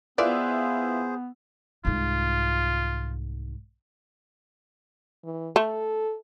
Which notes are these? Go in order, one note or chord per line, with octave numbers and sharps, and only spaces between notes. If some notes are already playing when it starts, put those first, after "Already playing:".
B3 E4 F4 G#4 B4 C5 D5
C2 G#2 F4
E3
A3 A4